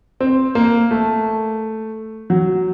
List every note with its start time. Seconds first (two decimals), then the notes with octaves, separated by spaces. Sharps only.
0.21 C4
0.55 A#3
0.91 A3
2.30 F#3